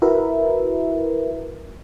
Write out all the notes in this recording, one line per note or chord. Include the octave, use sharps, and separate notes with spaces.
E4 F#4 A#4 B4 E5